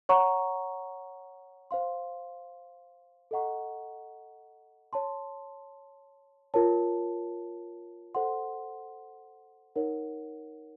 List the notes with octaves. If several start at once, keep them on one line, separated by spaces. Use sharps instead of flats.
C#5 F#5 A#5 C#6
C5 F5 C6
A4 D#5 F#5 A#5 C#6
C#5 A5 C6
F4 A#4 C#5 A5
A4 C5 F#5 C6
D#4 A#4 C#5 F#5